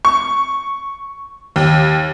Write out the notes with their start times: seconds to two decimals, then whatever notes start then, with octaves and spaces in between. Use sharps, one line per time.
0.05 C#6
1.56 D#2